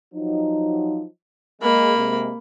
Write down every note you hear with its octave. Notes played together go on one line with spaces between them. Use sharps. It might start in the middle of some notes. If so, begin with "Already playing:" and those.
F3 F#3 D#4
G#3 A#3 B5
C3 G#3